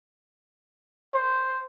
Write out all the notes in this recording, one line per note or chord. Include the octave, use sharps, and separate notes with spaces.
C5